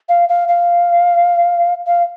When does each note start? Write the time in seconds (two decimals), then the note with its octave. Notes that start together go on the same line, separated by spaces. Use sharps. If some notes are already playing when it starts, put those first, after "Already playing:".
0.09 F5
0.29 F5
0.48 F5
1.87 F5